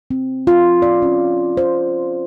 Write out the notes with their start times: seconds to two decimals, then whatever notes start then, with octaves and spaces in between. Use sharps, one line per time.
0.11 C4
0.47 F4
0.82 D5
1.02 C#4
1.57 C5